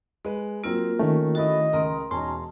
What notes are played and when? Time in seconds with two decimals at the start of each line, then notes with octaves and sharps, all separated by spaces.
0.25 G#3 B4
0.64 F#3 A#3 C4 F4 A#4 E6
0.99 D#3 A3 C#4
1.35 C#4 E4 F#4 A4 D#5 B5
1.73 C#2 A#4 A#5 C6 D#6
2.11 E1 C#4 D#4 A5 A#5 C6